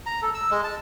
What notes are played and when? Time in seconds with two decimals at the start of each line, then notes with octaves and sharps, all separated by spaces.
0.06 A#5
0.22 A4
0.34 E6
0.51 G#3
0.64 A5